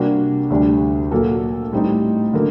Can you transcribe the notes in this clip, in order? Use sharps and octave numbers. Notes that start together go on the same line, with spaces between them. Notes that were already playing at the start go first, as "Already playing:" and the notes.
Already playing: C3 G3 A#3 D4 F#4
D2 D3 G3 D4
A#2 F#3 A#3 F#4 A4
A2 G3 C4 D#4
D3 F#3 A#3